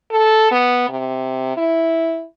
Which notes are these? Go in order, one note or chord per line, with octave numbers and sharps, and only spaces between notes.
A4
B3
C3
E4